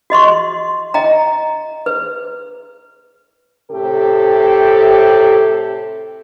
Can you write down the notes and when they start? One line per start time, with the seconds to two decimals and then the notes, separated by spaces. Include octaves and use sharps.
0.10 F#4 D#5 C6 C#6
0.94 D#5 G5 A#5
1.86 B4
3.71 A2 C3 G4 A4